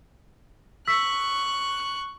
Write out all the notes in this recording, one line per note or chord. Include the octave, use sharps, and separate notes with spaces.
C#6 E6 F#6 B6